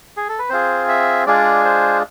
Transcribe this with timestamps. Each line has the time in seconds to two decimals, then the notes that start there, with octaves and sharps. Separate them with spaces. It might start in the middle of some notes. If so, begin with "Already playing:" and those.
0.17 G#4
0.29 A4
0.39 B4
0.49 C4 F4 G#4 C5
0.88 E5
1.27 G#3 D4 F4 G#4 D5
1.65 C5